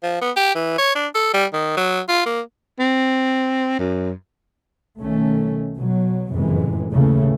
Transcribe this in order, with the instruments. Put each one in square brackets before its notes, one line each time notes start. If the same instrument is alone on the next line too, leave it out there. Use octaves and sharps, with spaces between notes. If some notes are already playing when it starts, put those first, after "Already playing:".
[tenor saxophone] F3
B3
G4
E3
C#5
D4
A4
G3
D#3
F#3
F4
A#3
[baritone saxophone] C4
F#2
[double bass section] B1 D#3 A3 C#4
B2 F#3
F#1 F2 A2 C3 E3 G#3
D#2 A2 C#3 E3 A3